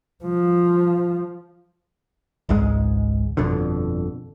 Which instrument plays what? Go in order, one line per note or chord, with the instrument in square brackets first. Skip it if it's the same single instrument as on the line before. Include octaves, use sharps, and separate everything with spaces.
[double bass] F3
[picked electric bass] G#1 C#2 G#2 G#3
G1 F2 B2 D3